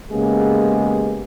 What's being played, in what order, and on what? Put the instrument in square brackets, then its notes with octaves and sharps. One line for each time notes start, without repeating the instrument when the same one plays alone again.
[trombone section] C#3 G#3 A#3 B3 G4 G#4